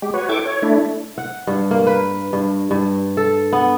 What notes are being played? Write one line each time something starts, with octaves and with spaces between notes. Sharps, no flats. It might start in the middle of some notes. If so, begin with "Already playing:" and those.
G#3 G4
F#4 B4 C#5
E4 A4 G5 C#6 D6
C#5
A3 D4 E4
F#5
G2
A#3
B4
G2
G2
A4
B3